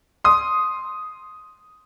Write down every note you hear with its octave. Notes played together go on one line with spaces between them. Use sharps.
C6 D#6